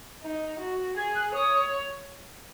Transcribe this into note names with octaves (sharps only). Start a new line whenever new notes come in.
D#4
F#4
G#4 G#6
F#6
C#5 D#6